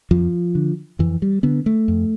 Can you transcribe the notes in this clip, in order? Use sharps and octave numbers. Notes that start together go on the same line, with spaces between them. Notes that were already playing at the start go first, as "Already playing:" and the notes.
F2 F3
D3
F2 E3
G3
D3 B3
A3
F2